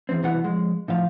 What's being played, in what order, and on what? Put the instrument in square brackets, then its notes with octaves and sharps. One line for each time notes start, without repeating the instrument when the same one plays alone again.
[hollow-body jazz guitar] E2 C4
C2 B2 E3 F#5
F2 G#3
A2 F3 F5